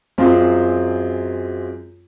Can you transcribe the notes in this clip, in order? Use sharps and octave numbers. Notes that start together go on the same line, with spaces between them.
F#2 F#3 G#3 C4 F4